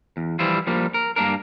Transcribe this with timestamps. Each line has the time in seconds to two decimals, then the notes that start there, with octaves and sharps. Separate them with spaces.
0.17 E2
0.39 E3 F3 G3 E4 F4
0.67 F3 G3 A#3
0.94 A#4
1.16 G2 A#3 D4 A#4